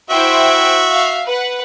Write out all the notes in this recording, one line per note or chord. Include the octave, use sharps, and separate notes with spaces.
E4 F#4 C5 E5 G5
F5
B4 F#5